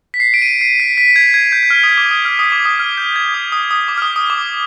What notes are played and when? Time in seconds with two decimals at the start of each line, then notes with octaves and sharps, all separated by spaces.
0.14 B6
0.20 C7
0.34 D7
0.42 D#7
0.47 D7
0.61 C7
0.80 B6
0.98 B6
1.09 B6
1.16 G#6
1.34 G#6
1.52 G6
1.63 G6
1.70 F6
1.83 D#6
1.97 D6
2.11 D#6
2.25 F6
2.39 D#6
2.52 D6
2.65 D#6
2.79 F6
2.97 G6
3.16 G#6
3.34 D#6
3.52 D#6
3.71 D#6
3.88 D6
3.97 F6
4.02 D#6
4.16 D#6
4.30 D6